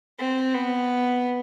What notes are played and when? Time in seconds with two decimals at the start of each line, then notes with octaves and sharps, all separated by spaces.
0.19 C4
0.55 B3